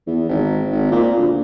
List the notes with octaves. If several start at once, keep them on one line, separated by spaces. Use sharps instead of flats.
E2
G#1
G#1
A#2
D2